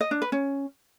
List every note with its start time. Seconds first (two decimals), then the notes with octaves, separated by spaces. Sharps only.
0.01 D#5
0.11 D4
0.22 B4
0.32 C#4